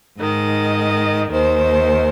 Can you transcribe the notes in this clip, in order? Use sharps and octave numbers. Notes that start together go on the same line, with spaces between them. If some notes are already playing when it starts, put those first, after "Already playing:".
G#2 D#3 D#5
D#2 D#3 C5